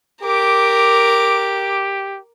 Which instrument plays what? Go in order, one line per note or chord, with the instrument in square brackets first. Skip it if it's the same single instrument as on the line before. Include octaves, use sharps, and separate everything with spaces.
[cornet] G4 [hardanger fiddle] A#4 D6